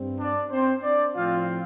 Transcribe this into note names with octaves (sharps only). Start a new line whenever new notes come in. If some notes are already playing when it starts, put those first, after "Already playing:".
Already playing: G2 G3 C4
D4 D5
C4 C5
D4 D5
A2 F3 C4 F4 F5